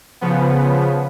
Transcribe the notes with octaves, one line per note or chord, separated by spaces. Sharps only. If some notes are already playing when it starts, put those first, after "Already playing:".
C#3 F3 B3